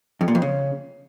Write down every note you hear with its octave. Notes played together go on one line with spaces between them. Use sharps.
F2
A#2
F2
C#3